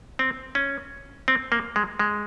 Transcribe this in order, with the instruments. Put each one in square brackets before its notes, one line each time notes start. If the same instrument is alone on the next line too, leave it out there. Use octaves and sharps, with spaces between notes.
[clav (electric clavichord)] C4
C#4
C4
A#3
G#3
G#3